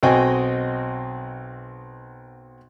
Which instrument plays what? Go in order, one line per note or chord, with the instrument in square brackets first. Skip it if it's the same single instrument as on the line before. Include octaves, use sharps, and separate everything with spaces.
[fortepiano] B1 C4 F#4 D#5 G5 G#5